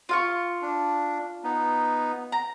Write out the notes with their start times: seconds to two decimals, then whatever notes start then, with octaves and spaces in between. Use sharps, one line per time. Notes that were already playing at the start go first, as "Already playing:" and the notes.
0.09 F4 F5 C#6
0.62 D4
1.44 B3 D#4
2.32 A#5